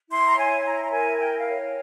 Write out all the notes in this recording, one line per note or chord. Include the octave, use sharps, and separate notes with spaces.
E4 C6
A#5
C#5 G#5
E4 A#5
A#5
A#4 G#5
E4 G5
F5
C#5